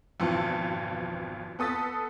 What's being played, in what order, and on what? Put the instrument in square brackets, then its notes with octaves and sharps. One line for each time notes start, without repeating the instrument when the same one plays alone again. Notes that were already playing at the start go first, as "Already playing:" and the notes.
[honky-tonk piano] G#1 F2 B2 E3 F4 A5
B3 A4 D#6 A6 B6